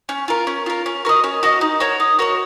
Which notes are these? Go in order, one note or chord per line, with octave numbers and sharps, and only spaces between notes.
C#4
F4 A#4
C#4
F4 A#4
C#4
F#4 A#4 D#5
C#4
F#4 A#4 D#5
D#4
F#4 A#4 C#5
D#4
F#4 A#4 C#5